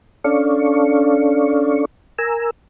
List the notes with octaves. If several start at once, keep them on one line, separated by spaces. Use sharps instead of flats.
C#4 D4 A4 D5 F5 C#6
A#4 G#5 A#5 E6